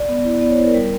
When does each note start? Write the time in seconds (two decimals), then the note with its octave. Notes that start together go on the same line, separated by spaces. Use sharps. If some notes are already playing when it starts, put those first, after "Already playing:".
Already playing: D5
0.08 B3
0.24 E4
0.41 B3 D5
0.49 C#5
0.58 E4 C5
0.66 A#4
0.74 G3